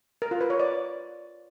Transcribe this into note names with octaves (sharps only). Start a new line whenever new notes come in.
A#4
F4
B4
C#5
D5